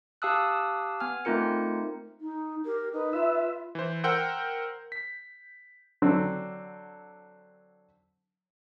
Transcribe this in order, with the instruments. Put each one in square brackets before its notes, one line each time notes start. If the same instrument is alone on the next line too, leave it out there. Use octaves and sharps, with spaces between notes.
[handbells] G4 F5 A5 D#6 E6 F#6
B3 G#5 F6
A3 C4 D#4 F4 A#4 C#7
[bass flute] D#4
[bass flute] G4 [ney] A#4
[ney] D#4 [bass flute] B4
[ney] F4 [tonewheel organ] E5
[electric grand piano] E3 C5
A#4 C5 F#5 G5 E6 G6
B6
[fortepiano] D3 F#3 C4 D4